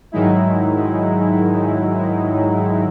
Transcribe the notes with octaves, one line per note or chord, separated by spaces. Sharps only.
G#2 D#3 F#3 G#3 D#4 E4